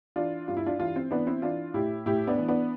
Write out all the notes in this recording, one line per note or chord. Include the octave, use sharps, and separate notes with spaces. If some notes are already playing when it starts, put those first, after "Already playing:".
E3 D4 F4
G2 F4
E4
D4 F4
E3 D4 F4
C4
E3 B3 D4
C4 E4
E3 D4 F4
A2 E4 G4
A2 E4 G4
B3 D4
E3
B3 D4